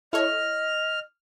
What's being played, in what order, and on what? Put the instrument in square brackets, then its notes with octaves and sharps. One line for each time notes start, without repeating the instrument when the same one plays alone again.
[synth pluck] E4 A4 C#5 [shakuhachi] D#5 [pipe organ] F6